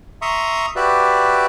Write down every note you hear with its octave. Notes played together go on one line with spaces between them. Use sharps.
E5 A#5 C6 C#6 D#6
F#4 G4 B4 D5 E5